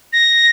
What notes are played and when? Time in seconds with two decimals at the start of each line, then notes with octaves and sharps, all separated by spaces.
0.13 A#6